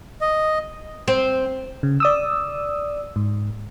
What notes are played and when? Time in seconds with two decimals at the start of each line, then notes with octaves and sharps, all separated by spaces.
0.21 D#5
1.08 C4
1.83 C#3
2.00 D5 D#6 E6
3.16 G#2